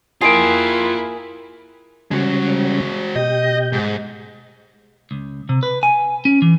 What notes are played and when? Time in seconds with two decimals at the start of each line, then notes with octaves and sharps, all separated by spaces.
0.21 A#3 E4 F4 G#4 G5 C7 D7
2.11 C#3 G3 G#3 C#4 F#4
3.16 B2 G4 D#5 G6
3.73 G#2
5.11 C#2
5.49 C3
5.63 B4
5.83 G#5
6.25 C#4
6.42 E3